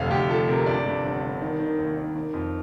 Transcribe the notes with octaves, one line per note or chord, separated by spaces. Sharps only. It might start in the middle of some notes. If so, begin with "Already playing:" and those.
Already playing: F1 D2 F5
F1 G4
F3 A4
C3 A#4
G2 D5
G2
G1
G2
D#3
D#3
D#2
D#3
D#3
F2